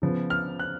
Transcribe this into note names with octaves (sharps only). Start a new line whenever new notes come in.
C#3 F3 B3
F6
F#6